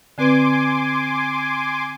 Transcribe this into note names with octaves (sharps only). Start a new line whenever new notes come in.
D3 C4 B4 G#5 C6 D6